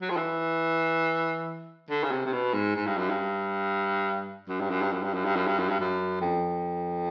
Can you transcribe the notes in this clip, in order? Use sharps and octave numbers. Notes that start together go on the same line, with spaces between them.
F#3
F3
E3
D3
C#3
C3
C3
B2
G#2
G#2
G2
F#2
G2
F#2
G2
F#2
G2
F#2
G2
F#2
G2
F#2
G2
F#2
G2
F#2
F2